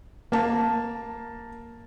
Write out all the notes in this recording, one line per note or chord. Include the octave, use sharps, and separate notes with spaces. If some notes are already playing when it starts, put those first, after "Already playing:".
A#3 A5